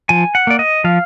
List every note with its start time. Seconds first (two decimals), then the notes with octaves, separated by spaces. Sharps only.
0.09 F3 G#5
0.35 F#5
0.47 A#3 D5
0.59 D#5
0.84 F3 F5